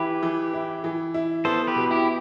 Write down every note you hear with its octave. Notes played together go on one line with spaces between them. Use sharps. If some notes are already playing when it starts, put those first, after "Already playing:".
Already playing: E3 E4 G4 B4
E3
E4
E3
E4
B3 A4 C5
G4 B4
B2
E4 G4